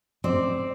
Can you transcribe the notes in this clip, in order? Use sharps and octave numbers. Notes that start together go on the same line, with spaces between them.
C4 D5